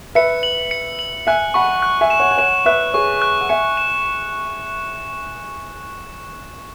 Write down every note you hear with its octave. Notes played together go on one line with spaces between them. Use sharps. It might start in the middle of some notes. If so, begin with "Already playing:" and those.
B4 E5 C#7
F#7
C#7
F#7
E5 G#5 F#6
F#5 B5 C#6
F#6
E5 G#5
E7
C#5 F#5
G#5
C#5 F#5 E7
B4 E5 F#6
G#4 C#5 C#6
F#6
F#5
E5 G#5 C#7
E7